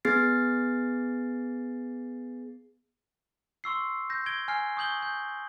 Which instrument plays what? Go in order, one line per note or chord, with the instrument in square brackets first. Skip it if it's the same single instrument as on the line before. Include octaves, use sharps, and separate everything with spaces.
[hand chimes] B3 G#4 A6 C7
[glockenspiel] C6 C#6 E6 C7
G6 A#6
G#6 D7 G7
G#5 F6 C7
C#6 D#6 G6 F#7 G7
G6